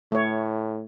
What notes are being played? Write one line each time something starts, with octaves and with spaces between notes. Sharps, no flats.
A2 A3 C#5